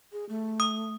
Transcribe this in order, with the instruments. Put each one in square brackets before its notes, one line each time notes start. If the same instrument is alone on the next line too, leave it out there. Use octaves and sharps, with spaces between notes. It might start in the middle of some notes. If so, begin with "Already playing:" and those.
[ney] G#4
A3
[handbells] D#6